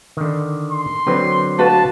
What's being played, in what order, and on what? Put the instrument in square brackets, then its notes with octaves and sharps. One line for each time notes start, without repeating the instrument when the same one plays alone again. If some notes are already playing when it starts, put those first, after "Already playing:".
[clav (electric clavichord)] D3 D#3
[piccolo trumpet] C6
[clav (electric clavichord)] D3 F#3 C4 [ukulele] B4
[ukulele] F#4 B4 F5 [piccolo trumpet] A5